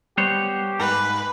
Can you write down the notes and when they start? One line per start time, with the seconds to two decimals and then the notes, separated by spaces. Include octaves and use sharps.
0.18 G3 B3 G4 C5 C#5
0.80 G#2 B4